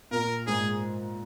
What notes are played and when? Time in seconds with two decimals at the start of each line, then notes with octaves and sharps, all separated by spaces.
0.11 A#2 A#4
0.47 G#2 G#4